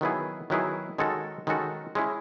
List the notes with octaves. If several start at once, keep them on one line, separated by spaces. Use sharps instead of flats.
D#3 F#3 B3 E4 G#4
D#3 F#3 B3 E4 G#4
D#3 G#3 C#4 F#4 A4
D#3 G#3 C#4 F#4 A4
G#3 C#4 E4